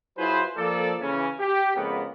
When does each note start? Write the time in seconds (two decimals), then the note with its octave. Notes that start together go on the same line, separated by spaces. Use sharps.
0.18 F#3 E4 F4 G#4 B4 C5
0.57 F3 A#3 A4 D5
1.00 C#3 E3 C#4
1.39 G4
1.76 F2 C#3 G#3 A#3 B3